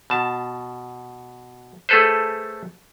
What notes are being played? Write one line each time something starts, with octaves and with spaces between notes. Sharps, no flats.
B2 A5
A3 G#4 A4 B4 C5